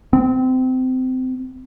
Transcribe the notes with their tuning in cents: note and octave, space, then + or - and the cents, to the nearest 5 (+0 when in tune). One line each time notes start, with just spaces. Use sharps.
C4 -25